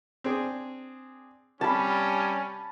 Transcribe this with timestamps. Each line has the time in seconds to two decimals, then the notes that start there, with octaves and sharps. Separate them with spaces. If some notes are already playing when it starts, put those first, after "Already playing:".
0.24 C4 D4 G#4
1.61 C3 G3 C#4 A5 B5